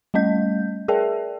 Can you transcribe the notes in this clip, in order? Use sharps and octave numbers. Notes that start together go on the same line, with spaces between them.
G3 A3 C#4 D#5 G6
G#4 A#4 D5 E5 G5 A5